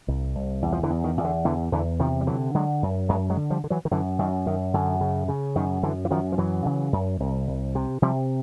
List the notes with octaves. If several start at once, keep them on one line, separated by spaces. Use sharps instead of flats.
C2
C2
E2
F3
D3 E3
E2
D#3
E2
D3
E2 D3 E3
E2 D3 E3
C3 D#3 F3
G3
D3 E3 F#3
D3 F#3 G#3
F#2
F#2 F#3 G#3
F#3 G#3
D3
F3 G3
D3
E3 F#3
D#3
F#2 D3 E3
F#2 D#3
F#2 D#3
F#2 D3
C#3
C#3
F#2 D#3
F#2 D3 E3
E3
F#2 D#3 F3
F3
F#2 E3 F#3
C#3
F#2
C2
C2
C3
C3 F3 G3